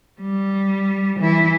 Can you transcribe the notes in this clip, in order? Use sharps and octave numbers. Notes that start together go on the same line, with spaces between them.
G3
E3 E4